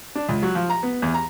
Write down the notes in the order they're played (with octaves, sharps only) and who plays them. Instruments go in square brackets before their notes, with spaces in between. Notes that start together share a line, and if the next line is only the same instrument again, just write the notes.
[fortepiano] D4
C#2
F#3
F3
A#5
B3
E2
A#5